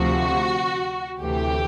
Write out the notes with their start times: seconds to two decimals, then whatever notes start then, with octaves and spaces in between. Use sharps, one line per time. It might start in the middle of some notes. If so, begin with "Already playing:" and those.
Already playing: D2 C3 F3 F#4
1.21 D2 C3 E3 A3 G4